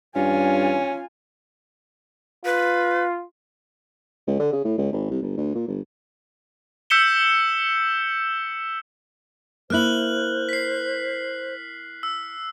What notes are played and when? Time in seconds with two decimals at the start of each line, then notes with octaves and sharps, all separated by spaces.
0.16 G2 C#4 F4 G#5
2.45 F4 B4
4.27 C#2
4.39 D3
4.53 C#3
4.65 A2
4.78 C#2
4.93 G#1
5.10 C2
5.22 G1
5.37 D2
5.55 A#2
5.68 G1
6.90 E6 G6 B6 C#7 E7 G7
9.70 A#3 E4 C5 F6 F#6 F#7
10.49 B6 C7
12.03 E6